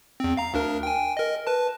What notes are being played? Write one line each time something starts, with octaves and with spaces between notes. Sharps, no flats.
E2 C4
F5 A#5
D2 D4 A#4
G5 G#5
A#4 D#5
B4 A5